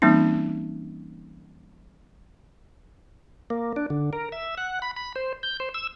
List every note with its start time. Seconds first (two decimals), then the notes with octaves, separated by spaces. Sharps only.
0.02 E3 G3 A#3 C4 C#4 D#4
3.50 A#3
3.76 D4
3.90 D3
4.13 A#4
4.32 E5
4.58 F#5
4.82 B5
4.96 B5
5.16 C5
5.43 G6
5.60 C5
5.74 E6